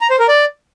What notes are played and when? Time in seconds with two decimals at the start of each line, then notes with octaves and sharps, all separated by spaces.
0.01 A#5
0.10 C5
0.19 A#4
0.29 D5